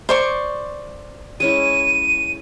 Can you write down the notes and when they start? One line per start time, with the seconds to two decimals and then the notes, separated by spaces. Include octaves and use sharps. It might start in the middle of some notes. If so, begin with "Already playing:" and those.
0.09 C5 D5 C#6
1.40 G#3 C#4 E4 D#7